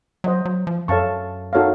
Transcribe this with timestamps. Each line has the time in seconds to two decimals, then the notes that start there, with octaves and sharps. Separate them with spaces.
0.24 F#3 C5 D#5 F#5
0.45 F#3
0.67 F3
0.88 F#2 A4 C#5 F5 A5 C#6
1.53 D#4 F#4 A4 C#5 F5